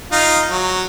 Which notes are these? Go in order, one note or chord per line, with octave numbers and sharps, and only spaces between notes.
D#4 F4
F#3